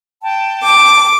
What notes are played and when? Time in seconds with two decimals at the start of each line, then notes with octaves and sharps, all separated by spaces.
0.22 G5 A5
0.64 D6